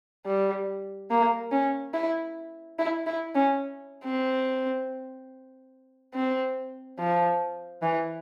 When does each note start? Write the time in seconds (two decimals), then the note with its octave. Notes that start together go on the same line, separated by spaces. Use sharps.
0.26 G3
1.10 A#3
1.52 C#4
1.94 E4
2.79 E4
3.07 E4
3.35 C#4
4.05 C4
6.14 C4
6.99 F3
7.82 E3